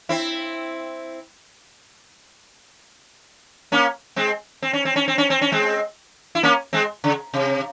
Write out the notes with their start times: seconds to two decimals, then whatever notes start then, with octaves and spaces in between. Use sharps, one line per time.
0.09 C4 E4
3.72 A#3 C#4
4.16 G#3 C4
4.62 C4
4.73 C#4
4.85 C4
4.96 C#4
5.08 C4
5.18 C#4
5.30 C4
5.41 C#4
5.52 G#3 C4
6.35 E4
6.43 A#3 C#4
6.73 G#3 C4
7.04 C#3
7.34 C3